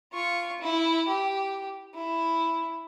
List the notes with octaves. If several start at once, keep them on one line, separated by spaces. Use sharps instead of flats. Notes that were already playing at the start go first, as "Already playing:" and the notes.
F4 C#6
E4
G4
E4